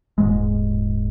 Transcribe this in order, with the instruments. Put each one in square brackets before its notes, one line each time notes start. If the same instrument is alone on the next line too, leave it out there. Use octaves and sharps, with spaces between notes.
[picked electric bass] D#1 G#2 G#3